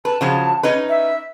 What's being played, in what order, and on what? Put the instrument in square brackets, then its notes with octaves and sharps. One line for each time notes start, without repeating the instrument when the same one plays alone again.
[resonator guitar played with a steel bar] B4 [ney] A5
[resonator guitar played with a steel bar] C#3 F3 F#3
C#4 D#4 B4
[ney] E5